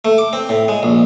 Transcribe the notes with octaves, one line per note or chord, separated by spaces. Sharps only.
A3
D6
C4
A2
G#3
A#1